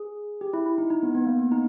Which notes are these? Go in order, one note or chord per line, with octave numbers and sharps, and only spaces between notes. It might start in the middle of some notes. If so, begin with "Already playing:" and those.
Already playing: G#4
G4
E4
E4
D#4
D#4
B3
B3
A#3
B3
D#4